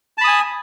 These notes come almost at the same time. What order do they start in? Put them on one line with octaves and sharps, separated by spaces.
A5 B5 D#6 G#5